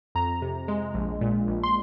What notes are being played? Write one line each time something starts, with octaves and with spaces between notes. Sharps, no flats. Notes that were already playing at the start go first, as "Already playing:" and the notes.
F2 A#5
C3
G#3
A#1
A#2
A#1
C6